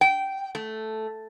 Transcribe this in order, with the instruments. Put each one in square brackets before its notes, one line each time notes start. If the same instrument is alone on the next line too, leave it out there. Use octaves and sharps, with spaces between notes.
[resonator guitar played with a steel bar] G5
A3